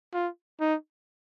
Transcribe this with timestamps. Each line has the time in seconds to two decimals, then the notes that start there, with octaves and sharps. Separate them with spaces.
0.14 F4
0.61 D#4